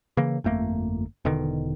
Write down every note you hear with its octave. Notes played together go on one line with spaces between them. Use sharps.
C#3 E3 A#3
G1 F2 A3 A#3
E1 B2 D3 D#3